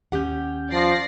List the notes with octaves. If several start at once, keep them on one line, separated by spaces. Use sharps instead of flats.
D#2 C#4 G4 F#5 G6
F3 D5 A#6 C7